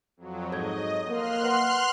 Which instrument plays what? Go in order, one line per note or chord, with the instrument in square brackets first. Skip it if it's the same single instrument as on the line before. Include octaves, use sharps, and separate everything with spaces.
[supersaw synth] F2 F#3
[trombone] G#2 [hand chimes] A4 C#5 G#6 [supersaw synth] D#5
[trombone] A#3 [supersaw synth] C6 F6 F#6
[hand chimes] B4 F#5